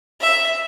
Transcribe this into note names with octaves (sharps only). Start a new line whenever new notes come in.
E5